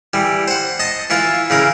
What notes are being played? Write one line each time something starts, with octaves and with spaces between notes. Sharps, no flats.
E3 G3
C5 F#5
D#5 A5
E3 E4 F4 B4
C#3 E3 A#4